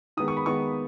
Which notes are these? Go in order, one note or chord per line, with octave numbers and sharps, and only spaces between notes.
D#3 G#3 B3 D#6
C#6
B5
D#3 G#3 B3 C#6